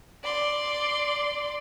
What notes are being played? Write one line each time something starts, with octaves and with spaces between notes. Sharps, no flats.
D5 C6